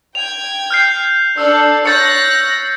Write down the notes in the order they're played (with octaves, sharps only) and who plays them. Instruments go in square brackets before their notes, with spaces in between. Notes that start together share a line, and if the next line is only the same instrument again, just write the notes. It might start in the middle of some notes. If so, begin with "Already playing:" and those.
[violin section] G5 G#6 [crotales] F7
[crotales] F6 G6 C7
[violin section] D4 A4 [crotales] E6
[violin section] C#5 F#6 A#6 [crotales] G6 A6 C#7